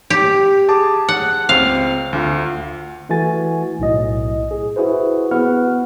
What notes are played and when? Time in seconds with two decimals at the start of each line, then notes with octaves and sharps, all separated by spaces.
0.10 G4
0.68 G#4 A5 D6
1.09 F#5
1.49 C#2 C4 F5
2.13 D2 F4
3.09 E3 A3 F#4 G#5 A6
3.79 B1 A2 D#5
4.51 G#4
4.76 E4 F#4 G#4 B4 C5
5.31 B3 F#4 B4 F#5 F6